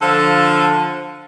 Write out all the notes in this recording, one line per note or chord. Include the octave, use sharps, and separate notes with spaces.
D3 F3 F4 A4